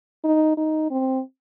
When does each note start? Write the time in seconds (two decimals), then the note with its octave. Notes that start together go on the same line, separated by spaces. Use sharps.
0.24 D#4
0.57 D#4
0.91 C4